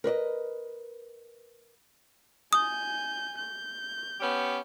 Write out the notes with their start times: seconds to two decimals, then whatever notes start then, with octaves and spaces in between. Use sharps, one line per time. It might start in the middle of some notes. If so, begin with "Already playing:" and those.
0.04 A#4 B4 D5 D#5
2.53 G#5 D#6 G6
3.38 G6
4.21 B3 C#4 G4